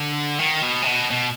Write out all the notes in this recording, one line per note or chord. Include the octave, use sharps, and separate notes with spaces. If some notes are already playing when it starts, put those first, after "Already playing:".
Already playing: D3
D#3
B2
C3
B2
B2